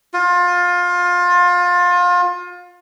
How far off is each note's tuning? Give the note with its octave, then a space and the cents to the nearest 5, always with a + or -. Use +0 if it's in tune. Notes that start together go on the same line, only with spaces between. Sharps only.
F4 +25